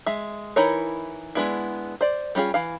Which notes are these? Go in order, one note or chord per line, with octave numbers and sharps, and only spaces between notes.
G#3 E5
E3 D#4 E4 A#4 C#5
G#3 A3 B3 D4 E4
C5 D5
G3 C#4 F4 G#4
E3 F5